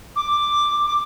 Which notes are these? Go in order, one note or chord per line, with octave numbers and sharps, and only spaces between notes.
D6
D6